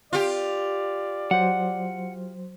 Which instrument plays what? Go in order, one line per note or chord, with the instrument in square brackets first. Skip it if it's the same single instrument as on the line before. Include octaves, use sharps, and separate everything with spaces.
[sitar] F4 G4 [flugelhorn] D5
[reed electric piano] F#3 C5 [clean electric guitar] F#5